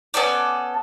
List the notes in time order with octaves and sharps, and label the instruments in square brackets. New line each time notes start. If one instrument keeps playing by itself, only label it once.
[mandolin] B3 C#4 A4 D5